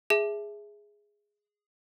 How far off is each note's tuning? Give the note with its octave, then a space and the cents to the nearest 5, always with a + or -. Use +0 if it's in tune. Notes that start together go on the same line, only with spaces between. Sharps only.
G#4 -5 E5 +0 A5 -20